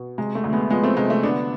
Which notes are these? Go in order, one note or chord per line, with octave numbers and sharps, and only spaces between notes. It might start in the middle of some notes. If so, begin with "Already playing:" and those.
Already playing: B2
C3 G#3
A3
D2
G#3 B3
F3 G#3 B3
A3 C4
C3 G#3
A3
D3 B3 D4